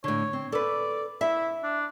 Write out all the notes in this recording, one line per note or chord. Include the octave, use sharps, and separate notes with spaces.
A2 D3 C#5
C4
A4 B4 D5
E4 E5
D4